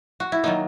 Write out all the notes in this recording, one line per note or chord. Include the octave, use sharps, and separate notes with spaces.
F#4
E4
D#3 F#3 A#3 D#4